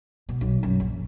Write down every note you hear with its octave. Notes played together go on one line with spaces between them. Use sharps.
B2
B1
F#2
A#1